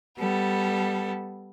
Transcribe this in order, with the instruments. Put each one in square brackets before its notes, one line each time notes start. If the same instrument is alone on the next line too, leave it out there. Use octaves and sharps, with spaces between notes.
[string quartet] G3 B3 A4